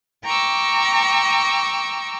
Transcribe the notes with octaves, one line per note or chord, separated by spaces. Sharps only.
G5 A#5 C#6 D6 E6